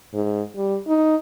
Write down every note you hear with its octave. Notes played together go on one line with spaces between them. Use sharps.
G#2
G3
D#4